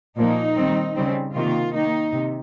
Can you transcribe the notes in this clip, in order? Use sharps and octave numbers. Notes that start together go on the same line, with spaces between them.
A#2 F3 A#3 D#4
D#3 G3 C4
C#3 G3 C4
C3 D#3 A#3 F4
D#3 A#3 D#4
C3